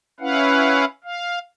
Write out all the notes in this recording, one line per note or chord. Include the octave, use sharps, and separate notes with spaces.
C#4 E4 B4 F5 F#5
F5